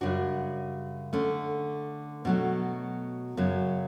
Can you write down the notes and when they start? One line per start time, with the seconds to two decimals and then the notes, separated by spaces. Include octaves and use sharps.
0.01 F#2 C#3 G3 D4 F#4
1.13 D3 A3 C#4
2.25 B2 F#3 A3
3.37 F#2 C#3 F#3